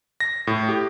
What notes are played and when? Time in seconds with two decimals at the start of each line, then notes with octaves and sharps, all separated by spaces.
0.20 A#6
0.47 A2
0.69 G4